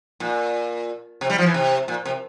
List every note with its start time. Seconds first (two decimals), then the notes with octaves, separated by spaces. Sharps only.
0.20 A#2
1.21 C3
1.30 G3
1.38 F3
1.46 E3
1.54 C3
1.88 A#2
2.05 C3